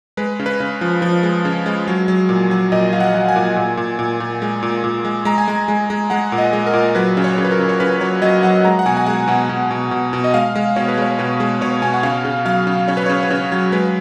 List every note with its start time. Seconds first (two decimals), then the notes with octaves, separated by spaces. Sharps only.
0.17 G#3 B4
0.39 C#3
0.46 B4
0.60 C#3
0.81 F3
1.02 F3
1.23 G#3
1.45 C#3
1.66 G#3
1.88 F#3
2.08 F#3
2.29 A#2
2.51 F#3
2.72 A#2 D#5
2.93 F#3 F5
3.00 F#5
3.15 F#3
3.29 G#5
3.36 A#2
3.56 A#2
3.77 A#2
3.99 A#2
4.20 A#2
4.42 G#3
4.63 A#2
4.84 A#2
5.05 G#3
5.25 G#3 A#5
5.38 G#5
5.48 G#3 A#5
5.68 G#3
5.90 G#3
6.10 G#3 F#5
6.32 A#2
6.38 D#5
6.53 G#3
6.66 A#4
6.74 A#2
6.95 F#3 B4
7.17 C#3
7.24 C#5
7.38 C#3
7.44 B4
7.51 A#4
7.59 C#3
7.69 C#5
7.80 C#3 B4
8.01 F#3 C#5
8.22 F#3 D#5
8.43 F#3 F#5
8.65 G#3 A#5
8.79 F#5
8.86 B2 G#5
8.97 G#5
9.06 G#3 F#5
9.28 B2 F#5
9.49 B2
9.71 B2
9.91 B2
10.13 B2
10.24 D#5
10.34 G#3 F5
10.55 G#3
10.76 B2 C#5
10.88 B4
10.98 G#3 C#5
11.19 B2 B4
11.40 G#3
11.61 B2 C#5
11.82 B2 G#5
11.94 F#5
12.03 C#3 F5
12.25 C#3
12.45 F#3 F5
12.67 C#3
12.88 C#3 C#5
12.97 B4
13.06 C#3 C#5
13.23 B4
13.30 C#3 C#5
13.52 F#3
13.72 G#3 B4